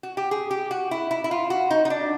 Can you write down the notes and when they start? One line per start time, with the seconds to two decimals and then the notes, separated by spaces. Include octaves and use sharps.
0.03 F#4
0.17 G4
0.31 G#4
0.51 G4
0.71 F#4
0.91 E4
1.11 E4
1.24 E4
1.31 F4
1.50 F#4
1.71 D#4
1.85 D#4
1.90 D4